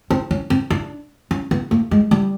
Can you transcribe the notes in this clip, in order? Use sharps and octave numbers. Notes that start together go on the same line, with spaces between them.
C4
C#4
C4
D4
C#4
B3
A#3
G#3
G3